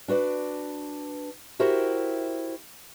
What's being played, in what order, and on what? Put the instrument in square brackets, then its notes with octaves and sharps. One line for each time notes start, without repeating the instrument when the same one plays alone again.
[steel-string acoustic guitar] D4 F#4 B4 D5
E4 F#4 G4 A#4 C5